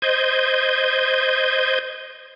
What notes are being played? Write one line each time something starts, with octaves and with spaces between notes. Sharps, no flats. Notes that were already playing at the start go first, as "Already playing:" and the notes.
C5 D#5 G6 G#6